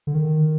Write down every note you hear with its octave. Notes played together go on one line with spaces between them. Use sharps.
D3
D#3